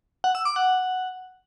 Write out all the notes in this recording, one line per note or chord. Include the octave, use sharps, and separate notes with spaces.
F#5
E6
D6
F#5